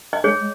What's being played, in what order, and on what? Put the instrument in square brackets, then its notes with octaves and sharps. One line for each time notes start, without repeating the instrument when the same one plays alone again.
[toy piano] D#5
[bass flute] G#3 [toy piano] G#4 C#5